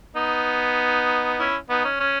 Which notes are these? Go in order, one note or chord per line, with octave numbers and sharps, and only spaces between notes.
B3 D#4
C#4 E4
B3 D#4
C#4
C#4